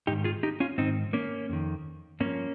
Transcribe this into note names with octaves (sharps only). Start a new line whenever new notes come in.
G#2 D#3 D#4 G4
F4 G#4
D#4 G4
C#4 F4
G#2 D#3 C4 D#4
A#3 C#4
F2 D#3
G2 F3 A#3 C#4